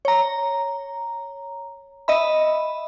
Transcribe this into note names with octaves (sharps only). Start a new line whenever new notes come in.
C#5 A#5
D#5 E5 B5